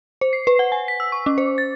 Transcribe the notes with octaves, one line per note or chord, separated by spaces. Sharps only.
C5
C7
B4
F#5
G#5
B6
E6
C#6
C#4
C5
A6